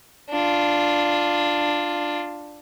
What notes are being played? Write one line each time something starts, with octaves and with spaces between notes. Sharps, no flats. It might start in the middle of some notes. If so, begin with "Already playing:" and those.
D4 F4